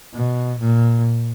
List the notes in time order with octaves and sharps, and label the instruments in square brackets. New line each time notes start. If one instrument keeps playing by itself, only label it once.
[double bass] B2
A#2